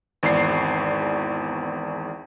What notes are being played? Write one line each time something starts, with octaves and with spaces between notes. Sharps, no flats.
G#1 E2 D5 C7